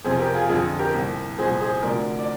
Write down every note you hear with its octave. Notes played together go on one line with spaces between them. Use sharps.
F2 C3 F3 G#4 C5
G4 A#4
F4 G#4
F2 D3 F3 F4 G#4
G4 A#4
C2 A#2 F3
C2 A#2 F3 G#4 C5
G#4 C5
D2 C3 F3 A#4 D5
D5